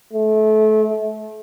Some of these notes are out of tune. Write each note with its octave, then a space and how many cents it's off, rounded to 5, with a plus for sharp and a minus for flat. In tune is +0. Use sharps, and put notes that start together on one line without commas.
A3 -30